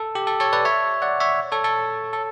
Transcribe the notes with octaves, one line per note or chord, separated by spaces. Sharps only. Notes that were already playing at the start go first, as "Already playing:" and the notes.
Already playing: A4
G4
A4
A4 C#5
B4 D5
C#5 E5
D5 F#5
C#5 E5
A4 C#5
A4
A4